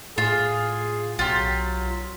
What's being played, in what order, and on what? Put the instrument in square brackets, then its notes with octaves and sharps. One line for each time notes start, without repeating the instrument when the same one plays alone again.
[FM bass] A2 [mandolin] F4 [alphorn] G#4
[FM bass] B1 [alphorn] F#3 [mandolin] F4 G4